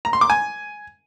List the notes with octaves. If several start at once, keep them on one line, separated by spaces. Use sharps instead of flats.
A#5
C6
D6
G#5